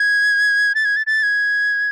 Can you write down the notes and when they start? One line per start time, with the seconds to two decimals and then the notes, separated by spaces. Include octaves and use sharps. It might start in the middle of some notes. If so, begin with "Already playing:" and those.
Already playing: G#6
0.75 A6
0.85 G#6
0.96 A6
1.07 A6
1.23 G#6